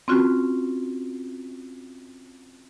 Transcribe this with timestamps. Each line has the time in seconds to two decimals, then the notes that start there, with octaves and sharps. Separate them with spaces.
0.08 C4 C#4 F4 F#4